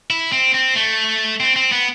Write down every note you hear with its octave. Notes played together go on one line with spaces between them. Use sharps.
E4
C4
C4
A3
C4
C4
B3